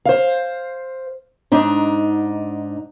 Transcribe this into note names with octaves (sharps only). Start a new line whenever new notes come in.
C5 F5
G#2 D4 D#4